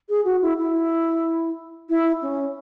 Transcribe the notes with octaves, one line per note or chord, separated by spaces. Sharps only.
G#4
F#4
E4
E4
E4
C#4